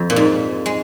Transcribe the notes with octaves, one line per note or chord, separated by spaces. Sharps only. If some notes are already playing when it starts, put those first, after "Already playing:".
Already playing: F2
A#2
G#2
G#3